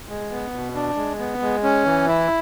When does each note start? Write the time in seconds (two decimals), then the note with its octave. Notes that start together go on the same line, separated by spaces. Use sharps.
0.08 G#3
0.31 B3
0.53 B2
0.75 D4
0.97 G#3
1.19 B3
1.42 G#3
1.63 C#4
1.85 E3
2.07 E4